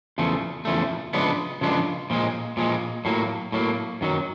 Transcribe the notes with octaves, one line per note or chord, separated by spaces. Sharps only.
E2 C#3 F3 A3
E2 C#3 F3 A3
C#3 F3 G#3 B3 D4
C#3 F3 G#3 B3 D4
A#2 F3 G#3
A#2 F3 G#3
A2 F#3 A#3
A2 F#3 A#3
F#2 D#3 F#3